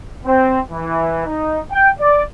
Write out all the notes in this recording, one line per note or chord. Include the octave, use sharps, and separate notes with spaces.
C4
E3
D#4
G5
D5